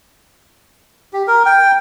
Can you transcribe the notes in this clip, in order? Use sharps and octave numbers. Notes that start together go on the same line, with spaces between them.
G4
A#4
G5